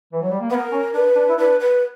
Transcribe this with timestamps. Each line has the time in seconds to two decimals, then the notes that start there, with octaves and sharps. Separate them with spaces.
0.12 E3
0.21 F#3
0.31 G3
0.40 A#3
0.50 B3 B4
0.54 A#4
0.72 C#4
0.94 D4 B4
1.16 D4
1.29 E4
1.38 D4 B4
1.60 B4